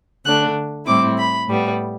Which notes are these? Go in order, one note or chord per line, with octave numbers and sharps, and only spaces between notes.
D3 A3 D4 F#6
A2 G3 C4 E4 D6
B5
A2 G3 B3